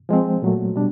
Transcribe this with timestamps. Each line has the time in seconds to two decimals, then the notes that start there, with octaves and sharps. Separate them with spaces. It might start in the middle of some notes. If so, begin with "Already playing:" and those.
0.09 F3 G#3 C4
0.42 A#2 F#3 A3
0.76 B2 G3 D4